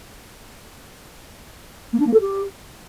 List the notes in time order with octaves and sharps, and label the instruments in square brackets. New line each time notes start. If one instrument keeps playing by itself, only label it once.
[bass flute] A#3
D4
A#3
A4
G4